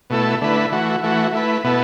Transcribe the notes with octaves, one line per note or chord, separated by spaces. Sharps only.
B2 A3 E4 A4
D3 A3 E4 B4
E3 A3 F#4
E3 A3 F#4
A3 E4 B4
B2 B3 E4 A4